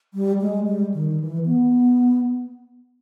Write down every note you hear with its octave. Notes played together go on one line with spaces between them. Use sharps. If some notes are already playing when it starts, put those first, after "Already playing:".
G3
G#3
G3
D#3
D#3
E3
B3